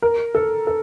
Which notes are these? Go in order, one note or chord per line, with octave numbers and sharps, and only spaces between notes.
A#4
A4
A4